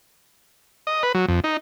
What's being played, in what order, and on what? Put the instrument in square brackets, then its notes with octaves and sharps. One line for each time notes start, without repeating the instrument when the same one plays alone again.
[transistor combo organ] D#5
B4
F#3
F2
D#4